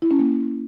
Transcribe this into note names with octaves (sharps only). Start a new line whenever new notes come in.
E4
C#4
A#3